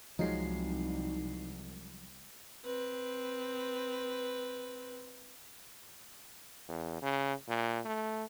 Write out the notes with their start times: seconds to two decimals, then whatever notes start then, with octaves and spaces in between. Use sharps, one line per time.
0.19 C2 F3 F#3 G#3 D#4 C7
2.64 C4 B4
6.69 E2
7.02 C#3
7.48 A#2
7.85 A3